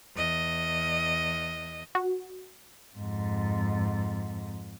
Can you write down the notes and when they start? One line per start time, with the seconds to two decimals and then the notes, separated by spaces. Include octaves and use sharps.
0.15 E2 D#5
1.95 F#4
2.98 F2 G#2